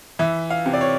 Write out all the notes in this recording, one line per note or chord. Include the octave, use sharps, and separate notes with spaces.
E3 E5
F5
C3
D5
C#5